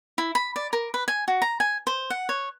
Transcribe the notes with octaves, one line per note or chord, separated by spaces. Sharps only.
E4
B5
D5
A#4
B4
G#5
F#4
A#5
G#5
C5
F#5
C#5